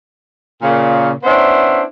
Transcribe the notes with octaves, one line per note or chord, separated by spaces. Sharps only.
A#2 C#3
B3 C#4 D4 E4 C5